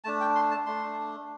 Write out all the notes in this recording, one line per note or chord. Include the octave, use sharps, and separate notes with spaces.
A3 D4 A5
G5
C6
A5
A3 D4 C6